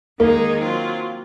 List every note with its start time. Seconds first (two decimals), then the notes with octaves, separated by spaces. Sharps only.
0.19 D#3 G#3 A#3 D#4 G#4
0.59 F#3 C4 F4